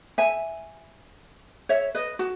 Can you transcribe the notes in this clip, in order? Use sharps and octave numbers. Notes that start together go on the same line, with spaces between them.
E5 G#5
C#5 E5
B4 D#5
F#4